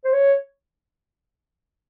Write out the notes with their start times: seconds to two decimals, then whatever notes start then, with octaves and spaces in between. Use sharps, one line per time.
0.05 C5
0.13 C#5